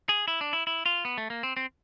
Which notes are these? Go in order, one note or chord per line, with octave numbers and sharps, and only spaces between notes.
G#4
E4
D4
E4
E4
F4
B3
A3
A#3
C4
C4